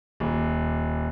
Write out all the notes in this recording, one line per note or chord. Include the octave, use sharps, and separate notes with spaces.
D#1